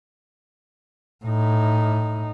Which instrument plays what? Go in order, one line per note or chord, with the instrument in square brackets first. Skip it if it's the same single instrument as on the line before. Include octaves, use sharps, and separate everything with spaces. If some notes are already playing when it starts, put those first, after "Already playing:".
[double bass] A2 D#4